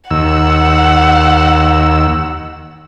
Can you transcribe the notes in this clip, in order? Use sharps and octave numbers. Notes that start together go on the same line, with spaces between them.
D#2 F#5 E6